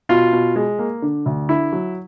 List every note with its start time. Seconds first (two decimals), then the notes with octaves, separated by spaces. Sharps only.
0.09 B2 F4
0.33 B2
0.56 G#3
0.79 A#3
1.02 D3
1.26 D2
1.49 D3 E4
1.72 F#3